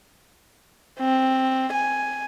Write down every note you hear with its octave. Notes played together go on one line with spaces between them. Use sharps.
C4
G#5